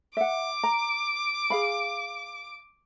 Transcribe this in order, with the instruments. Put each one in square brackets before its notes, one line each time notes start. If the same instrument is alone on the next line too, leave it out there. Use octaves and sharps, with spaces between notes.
[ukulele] E5 F#5 [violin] D6
[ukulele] A#5
G#4 F5 B5